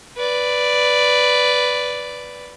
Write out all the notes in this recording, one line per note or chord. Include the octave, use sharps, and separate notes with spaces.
B4 D5